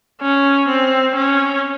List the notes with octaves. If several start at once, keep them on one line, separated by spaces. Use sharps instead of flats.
C#4
C4
C#4